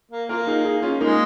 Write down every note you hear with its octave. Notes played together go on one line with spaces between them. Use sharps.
A#3
A#3 F4 A#4
D#4 G#4
D#4 G#4
C#4 F4
G#3 A#3 D#4